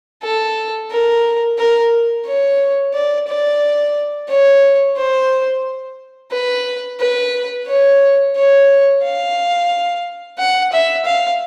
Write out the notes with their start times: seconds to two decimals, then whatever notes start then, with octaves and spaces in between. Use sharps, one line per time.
0.23 A4
0.91 A#4
1.58 A#4
2.26 C#5
2.94 D5
3.28 D5
4.29 C#5
4.97 C5
6.32 B4
7.00 B4
7.67 C#5
8.36 C#5
9.03 F5
10.39 F#5
10.72 E5
11.05 F5